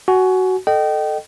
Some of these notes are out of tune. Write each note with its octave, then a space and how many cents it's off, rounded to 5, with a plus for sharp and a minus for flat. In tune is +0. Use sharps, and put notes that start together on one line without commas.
F#4 +10 G#5 +25
A4 +0 D#5 -25 G5 -25